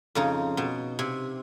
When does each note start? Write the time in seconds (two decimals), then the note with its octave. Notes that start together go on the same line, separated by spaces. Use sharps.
0.15 F2 C#3 D#4
0.57 B2
0.99 C3